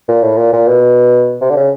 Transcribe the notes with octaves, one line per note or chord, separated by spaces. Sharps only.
A#2
A2
A#2
A#2
B2
C3
D3
C#3